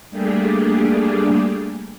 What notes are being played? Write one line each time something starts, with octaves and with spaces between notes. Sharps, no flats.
G3 A3 A#3 D4 G4 G#4